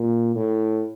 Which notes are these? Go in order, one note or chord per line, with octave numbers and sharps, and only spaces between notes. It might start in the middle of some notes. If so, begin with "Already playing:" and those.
Already playing: A#2
A2